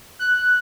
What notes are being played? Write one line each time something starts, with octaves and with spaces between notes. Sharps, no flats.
F#6